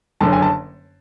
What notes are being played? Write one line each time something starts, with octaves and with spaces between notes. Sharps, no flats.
F#1 F#2 D3 A5
G#5
A5